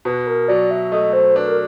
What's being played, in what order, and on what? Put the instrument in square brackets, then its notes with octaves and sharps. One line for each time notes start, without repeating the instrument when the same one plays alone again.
[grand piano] B2 [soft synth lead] B4
[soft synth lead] A#4
[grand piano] F#3 [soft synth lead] D5
[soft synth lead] E5
[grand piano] A3 [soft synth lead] D#5
[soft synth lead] C5
[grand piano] D4 [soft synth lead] B4
[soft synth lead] A#4